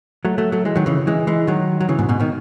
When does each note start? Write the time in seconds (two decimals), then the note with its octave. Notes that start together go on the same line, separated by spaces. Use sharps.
0.25 F#3 A3
0.38 F#3 A3
0.52 F#3 A3
0.65 E3 G#3
0.76 D#3 F#3
0.86 C#3 E3
1.07 E3 G#3
1.27 E3 G#3
1.47 D#3 F#3
1.81 F#3
1.89 C#3 E3
1.99 G#2 B2
2.09 G#2 B2
2.20 B2 D#3